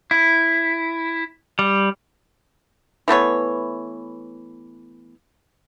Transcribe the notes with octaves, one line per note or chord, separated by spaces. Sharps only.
E4
G3
E3 A3 B3 C#5